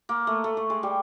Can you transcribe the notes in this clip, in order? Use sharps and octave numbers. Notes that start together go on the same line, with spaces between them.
A#3
A3
A3
A3
G#3
G3